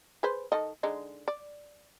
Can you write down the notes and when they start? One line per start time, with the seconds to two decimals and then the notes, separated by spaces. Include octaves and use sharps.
0.23 G#4 B4 C5
0.52 D#3 A4 D#5
0.83 D3 G#3 D#4
1.28 D5